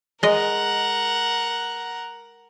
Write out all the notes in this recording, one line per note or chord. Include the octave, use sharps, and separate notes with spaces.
G#3 A#4 D#5 F#5